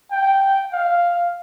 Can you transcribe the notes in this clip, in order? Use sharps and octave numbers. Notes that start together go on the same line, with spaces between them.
G5
F5